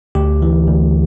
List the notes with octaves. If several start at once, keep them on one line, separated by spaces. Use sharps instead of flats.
D2 G4
E3
D2